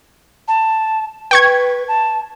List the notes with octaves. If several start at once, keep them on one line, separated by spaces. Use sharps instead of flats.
A5
B4 G5 C#6 G#6
A5